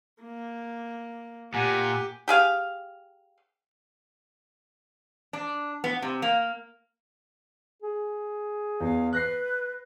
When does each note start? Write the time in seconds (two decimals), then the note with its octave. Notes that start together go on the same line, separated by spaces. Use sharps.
0.23 A#3
1.54 A#2 G4 F#5 G#5
2.28 G4 G#4 F5
5.33 D4
5.84 B3
6.02 C3
6.22 A#3
7.82 G#4
8.80 E2 F5
9.13 B4 F#6 A#6 C7